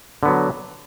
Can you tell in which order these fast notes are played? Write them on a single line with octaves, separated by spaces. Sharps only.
D3 B3 F#3